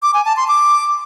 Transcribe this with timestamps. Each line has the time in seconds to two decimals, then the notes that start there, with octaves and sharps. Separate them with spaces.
0.02 D6
0.14 G#5
0.25 A5
0.37 C6
0.48 D6